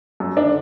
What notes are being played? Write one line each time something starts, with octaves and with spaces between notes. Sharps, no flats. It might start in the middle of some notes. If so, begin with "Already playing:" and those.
F#2
D4
D3